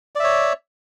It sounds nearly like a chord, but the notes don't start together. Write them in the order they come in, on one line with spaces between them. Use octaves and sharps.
D5 E5 C#5